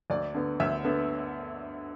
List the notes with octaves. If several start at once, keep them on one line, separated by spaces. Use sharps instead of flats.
D2 D5
D3 B3
D2 E5
D3 B3